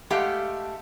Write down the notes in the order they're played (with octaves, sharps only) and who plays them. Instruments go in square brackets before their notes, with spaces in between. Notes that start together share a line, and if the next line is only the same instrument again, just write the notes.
[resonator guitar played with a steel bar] G#3 A3 G4 F5 F#5